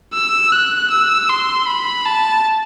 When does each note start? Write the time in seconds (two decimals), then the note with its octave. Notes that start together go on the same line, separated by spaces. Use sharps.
0.13 E6
0.52 F#6
0.91 E6
1.29 C6
1.67 B5
2.05 A5